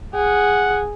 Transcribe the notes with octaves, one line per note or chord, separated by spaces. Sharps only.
G#4 F#5